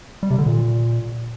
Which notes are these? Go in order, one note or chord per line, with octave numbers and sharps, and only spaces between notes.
G3
C3
D3
A#2